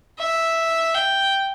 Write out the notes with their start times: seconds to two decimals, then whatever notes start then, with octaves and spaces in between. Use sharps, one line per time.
0.19 E5
0.95 G5